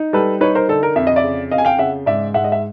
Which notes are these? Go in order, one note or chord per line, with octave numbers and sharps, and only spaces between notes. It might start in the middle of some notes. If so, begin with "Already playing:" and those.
Already playing: D#4
G3 A4 B4
D#4 B4 C#5
A#4 C5
D3 A4
A#4
F2 E5
D#5
D5 E5
C#3
F2 D#5 F5
G#5
F5 G5
C#3 E5 F#5
G#2 D5 E5
G#2 E5 F#5
D#5
E5